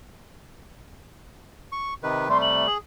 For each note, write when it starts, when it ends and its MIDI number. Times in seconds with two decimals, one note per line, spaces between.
1.72 1.94 85
2.03 2.29 48
2.03 2.29 51
2.03 2.29 71
2.03 2.28 75
2.29 2.67 48
2.29 2.67 55
2.29 2.67 57
2.29 2.37 84
2.42 2.72 102
2.67 2.78 68